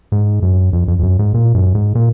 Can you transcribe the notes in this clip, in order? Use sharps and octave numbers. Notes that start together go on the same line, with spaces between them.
G#2
F#2
F2
F2
F2
F#2
G#2
A#2
F#2
G#2
A#2